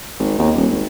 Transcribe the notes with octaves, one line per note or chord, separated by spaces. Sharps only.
G#1
D#2
D#1
G#1